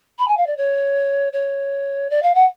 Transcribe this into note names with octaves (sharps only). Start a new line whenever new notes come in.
B5
G#5
F5
D5
C#5
C#5
D5
F5
F#5